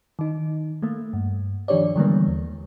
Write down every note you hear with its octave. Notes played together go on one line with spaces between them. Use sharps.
D#3 D#4
A3 A#3
G2
D#3 F3 D4 G4 C#5 D5
D3 E3 G3 G#3 A#3 B3
D#2